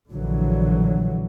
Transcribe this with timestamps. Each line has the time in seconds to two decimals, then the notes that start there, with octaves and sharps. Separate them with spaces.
0.10 A#1 D3 E3 F#3